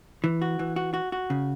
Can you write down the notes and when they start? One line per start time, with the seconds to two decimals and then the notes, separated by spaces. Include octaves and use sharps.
0.24 E3
0.42 F#4
0.59 E3
0.76 F#4
0.94 F#4
1.12 F#4
1.30 C#3